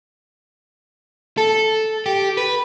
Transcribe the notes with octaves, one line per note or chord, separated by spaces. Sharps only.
A4
G4
B4